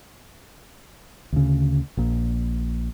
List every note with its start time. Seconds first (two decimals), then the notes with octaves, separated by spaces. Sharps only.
1.32 D2 C#3
1.97 A#1 A#2